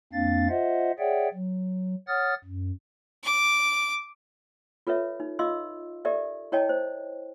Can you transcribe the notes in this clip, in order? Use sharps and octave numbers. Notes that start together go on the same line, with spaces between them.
F2 A#3 C4 D4 F5 A6
F4 C5 D#5 E5 F#5
G#4 C#5 D5 E5 F#5 G5
F#3
C#5 F#5 D#6 F6 A6
F#2
D6
F4 A4 B4 C#5 E5
D#4
F4 D#5 F5 C6 E6
G4 A4 A#4 D5 E5
E4 A#4 C#5 D#5 G5 A5
C5